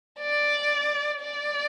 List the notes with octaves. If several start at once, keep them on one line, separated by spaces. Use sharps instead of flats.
D5
D5